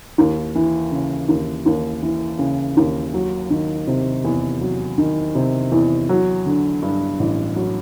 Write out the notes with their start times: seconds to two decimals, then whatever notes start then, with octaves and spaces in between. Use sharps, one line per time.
0.18 D#2
0.55 E3
0.92 C#3
1.28 D#2
1.66 D#2
2.02 E3
2.39 C#3
2.77 D#2
3.14 F#3
3.50 D#3
3.87 C3
4.24 E2
4.61 F#3
4.98 D#3
5.35 C3
5.72 E2
6.09 F#3
6.46 D3
6.82 G2
7.19 A1
7.56 F#3